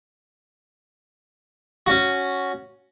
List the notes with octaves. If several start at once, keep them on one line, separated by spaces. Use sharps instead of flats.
C#4 F#4